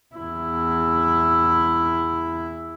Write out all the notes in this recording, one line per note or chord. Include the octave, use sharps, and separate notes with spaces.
E2 E4